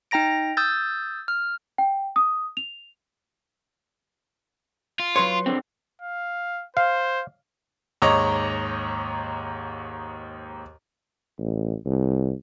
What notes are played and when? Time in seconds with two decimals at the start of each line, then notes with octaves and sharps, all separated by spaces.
0.11 D#4 G5 A#5 A#6 D7
0.57 D#6 E6 G6 A6
1.28 F6
1.78 G5
2.16 D#6
2.57 F7
5.00 F4
5.16 F#3 B4 C#5 C6
5.46 D3 C4
6.02 F5
6.77 C5 F5
8.02 D#2 G#2 C#5 D#5 A#5 D6
11.38 A1
11.86 C2